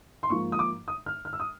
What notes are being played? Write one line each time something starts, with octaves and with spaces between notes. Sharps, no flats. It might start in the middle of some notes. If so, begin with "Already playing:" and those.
C6
G#2 F3 A#3 C#6
D#6
D6
D#6
F6
F6
E6
D#6